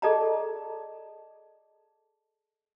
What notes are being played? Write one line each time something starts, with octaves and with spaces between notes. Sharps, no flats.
G#4 A4 D5 D#5 A5 A#5